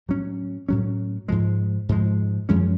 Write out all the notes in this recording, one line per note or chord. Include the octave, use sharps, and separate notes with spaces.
A2 F#3 C#4
A2 F#3 C#4
G#2 F3 G#3
G#2 F3 G#3
F#2 F3 G#3 C#4